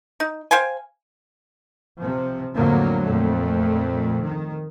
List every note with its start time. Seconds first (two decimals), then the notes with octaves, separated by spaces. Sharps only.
0.20 D#4
0.51 C5 F5 G5 G#5
2.00 C3 F3
2.54 F2 A2 D3 F#3 A#3
3.04 F2 A#2 A3
4.21 D#3